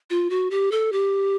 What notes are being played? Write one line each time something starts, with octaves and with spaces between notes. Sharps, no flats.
F4
F#4
G4
A4
G4